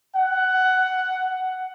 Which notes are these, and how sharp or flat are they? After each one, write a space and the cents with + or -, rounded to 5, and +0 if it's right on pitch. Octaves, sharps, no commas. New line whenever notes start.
F#5 +10